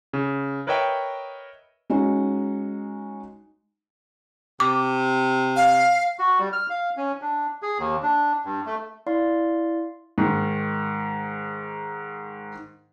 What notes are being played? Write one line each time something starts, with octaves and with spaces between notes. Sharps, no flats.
C#3
A#4 B4 C#5 D#5 E5 G5
G#3 C#4 D#4 F#4
C3 D6
F5
F#4
G3
F6
F5
C#4
D4
G#4
D#2
D4
G2
A3
E4 D5 F5 C6
G#2 D#3